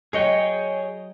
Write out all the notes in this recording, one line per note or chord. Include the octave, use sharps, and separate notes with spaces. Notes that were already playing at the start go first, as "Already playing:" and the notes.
F#3 G#4 C#5 D#5 G5